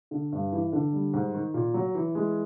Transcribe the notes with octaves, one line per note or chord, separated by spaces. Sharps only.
D3
G2
E3
D3
G3
G#2
D#3
A#2
F#3
E3
G#3